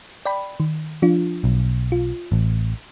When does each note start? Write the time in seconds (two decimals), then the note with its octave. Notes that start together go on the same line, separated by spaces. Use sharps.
0.26 D5 G5 B5
0.60 D#3
1.02 F3 D4 F4
1.44 B1
1.92 F4
2.32 A1